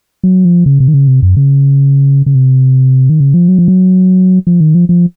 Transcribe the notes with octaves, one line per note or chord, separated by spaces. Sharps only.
F#3
F3
C#3
C3
D#3
C#3
C3
F#2
C#3
C#3
C3
D#3
C#3
F3
F#3
F3
F#3
F3
D#3
F3
F3